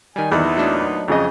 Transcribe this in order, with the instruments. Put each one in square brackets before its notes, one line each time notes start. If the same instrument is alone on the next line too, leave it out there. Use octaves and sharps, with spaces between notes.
[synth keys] D#3 G3 [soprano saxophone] G#5
[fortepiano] E2 [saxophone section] A#2 B3 D#4 [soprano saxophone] E4
[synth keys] F#3 A3 D4
[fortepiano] F2 C#3 D#5 [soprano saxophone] G#4